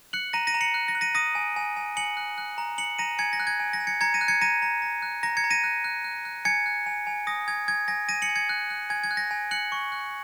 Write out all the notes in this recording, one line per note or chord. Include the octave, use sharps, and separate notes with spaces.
F#6 C#7 F#7
A#5 A#6 D#7
A#6 D#7
A#5
C#7 F#7
F#6
A#6
F#6
A#6 D#7
D#6 A#6 D#7
G#5
G#5
G#5
G#5 C#7 F#7
F#6
F#6
A#5
A#5 C#7 F#7
A#5 A#6 D#7
G#5 G#6 C#7
A#6
F#6
G#6
G#5
A#6
G#5
G#6 C#7
A#5 G#6 C#7
A#6 D#7
F#6
G#6 C#7
A#5 A#6 D#7
A#5
A#5
F#6
A#5 A#6
G#6 C#7
A#5
A#6 D#7
F#6
F#6
F#6
F#6
G#5 G#6 C#7
F#6
G#5
G#5
D#6 A#6
G#5 G#6
G#5 G#6
G#5 A#6
G#5 A#6 D#7
C#7 F#7
G#5
G#6 C#7
F#6
F#6
G#5 G#6
G#6
F#6
A#6
G#5
F#6 C#7 F#7
C#6
F#6